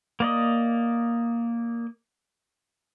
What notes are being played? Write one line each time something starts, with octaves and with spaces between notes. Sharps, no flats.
A#3 D5 D#5